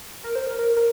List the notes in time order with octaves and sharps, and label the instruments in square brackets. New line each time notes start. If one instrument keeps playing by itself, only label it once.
[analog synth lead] A#4
C5
A#4
A#4
A#4